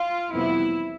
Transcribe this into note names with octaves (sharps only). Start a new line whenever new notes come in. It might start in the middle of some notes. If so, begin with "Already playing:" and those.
Already playing: F4
F2 C3 E3 G3 B3 E4